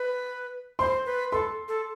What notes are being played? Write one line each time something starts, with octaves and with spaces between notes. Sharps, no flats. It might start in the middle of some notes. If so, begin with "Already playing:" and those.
Already playing: B4
C5 C6
B4
A4 C6
A4